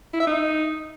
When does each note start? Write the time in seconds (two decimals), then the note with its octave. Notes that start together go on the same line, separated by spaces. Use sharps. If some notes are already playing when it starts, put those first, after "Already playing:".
0.14 E4
0.20 E5
0.27 D#4